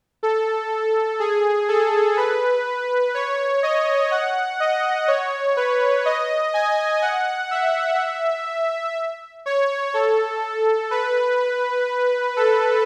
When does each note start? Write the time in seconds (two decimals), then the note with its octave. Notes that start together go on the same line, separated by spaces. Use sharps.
0.23 A4
1.20 G#4
1.68 A4
2.17 B4
3.15 C#5
3.63 D#5
4.11 F#5
4.60 D#5
5.08 C#5
5.57 B4
6.05 D#5
6.54 G#5
7.02 F#5
7.51 E5
9.46 C#5
9.94 A4
10.91 B4
12.37 A4